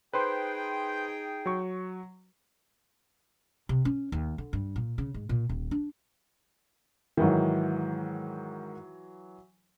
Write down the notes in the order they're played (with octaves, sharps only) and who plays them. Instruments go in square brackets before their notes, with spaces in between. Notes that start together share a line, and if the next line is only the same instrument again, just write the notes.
[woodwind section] D#4 G#4 G5 [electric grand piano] B4 C5 C6
[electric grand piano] F#3 C#6
[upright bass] C3
C#4
D#2
D3
G2
A#2
C#3
G#2
A#2
D#1
D4
[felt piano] G#2 D#3 [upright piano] E3 F#3